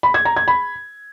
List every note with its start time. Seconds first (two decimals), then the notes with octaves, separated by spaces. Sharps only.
0.03 B5
0.14 G#6
0.25 A#5
0.37 G#6
0.48 B5